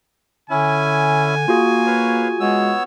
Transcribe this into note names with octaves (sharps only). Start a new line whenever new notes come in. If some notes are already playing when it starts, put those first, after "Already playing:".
D3 C#4 E4 G#5
A#3 F4 F#4 G#4
B4 C#5 F5
G#3 B3 C#5 E6